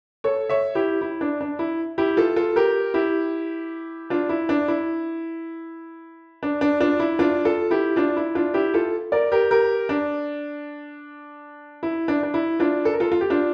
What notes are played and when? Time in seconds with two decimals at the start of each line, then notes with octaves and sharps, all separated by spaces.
0.24 A4 C#5
0.49 C#5 E5
0.75 E4 G4
1.01 E4
1.21 D4
1.41 D4
1.59 E4
1.98 E4 G4
2.17 F4 A4
2.36 F4 A4
2.56 G4 A#4
2.94 E4 G4
4.10 D4 F4
4.29 E4
4.49 D4
4.68 E4
6.43 D4
6.61 D4
6.80 D4 F4
7.00 E4
7.19 D4 F4
7.45 F4 A4
7.71 E4 G4
7.96 D4 F4
8.16 E4
8.35 D4 F4
8.54 E4 G4
8.74 F4 A4
9.12 A#4 D5
9.32 G4 A#4
9.51 G4 A#4
9.89 D4
11.83 E4
12.08 D4
12.23 D4
12.34 E4
12.60 D4 F4
12.85 A4
12.93 A#4
13.00 F4 A4
13.12 F4
13.21 G4
13.30 D4 F4